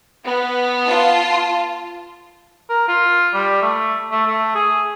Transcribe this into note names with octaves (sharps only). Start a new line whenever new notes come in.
B3
F4 A5
A#4
F4
G3
A3
A3
A3
G#4